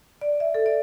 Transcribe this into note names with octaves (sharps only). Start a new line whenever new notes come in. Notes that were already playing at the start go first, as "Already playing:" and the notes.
D5
E5
A4
D5